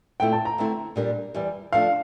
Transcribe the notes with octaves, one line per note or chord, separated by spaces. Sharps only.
A#2 A3 C4 E4 G5
A5
A#5
D3 A3 C4 E4
A#2 G3 D4 G4 A#4
E2 E3 G3
F3 A3 D4 F5